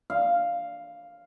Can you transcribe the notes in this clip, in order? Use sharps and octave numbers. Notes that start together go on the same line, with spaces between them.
F5